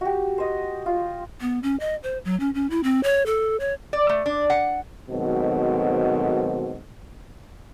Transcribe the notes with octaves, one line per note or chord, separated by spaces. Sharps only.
F#4 G4
C5 D#5
F4
B3
C#4
D#5
C5
F#3
C#4
C#4
E4
C4
C#5
A4
C#5
D5
A3
D4
F#5
G#2 B2 D#3 F#3 A3 C4